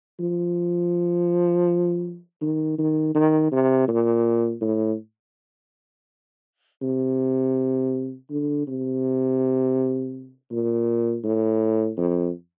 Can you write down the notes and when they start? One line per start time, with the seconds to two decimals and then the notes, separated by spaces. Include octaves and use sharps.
0.20 F3
2.41 D#3
2.78 D#3
3.14 D#3
3.52 C3
3.88 A#2
4.61 A2
6.82 C3
8.30 D3
8.67 C3
10.51 A#2
11.24 A2
11.97 F2